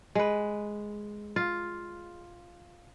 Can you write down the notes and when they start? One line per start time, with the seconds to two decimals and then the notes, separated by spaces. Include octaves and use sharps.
0.15 G#3 B4
1.36 F4